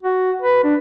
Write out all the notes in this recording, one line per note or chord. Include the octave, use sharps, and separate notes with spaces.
F#4
B4
D4